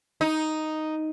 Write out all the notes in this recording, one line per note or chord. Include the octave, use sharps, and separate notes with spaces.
D#4